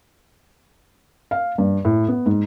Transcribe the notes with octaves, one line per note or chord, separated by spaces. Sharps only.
F5
G2
A2
B3
G#2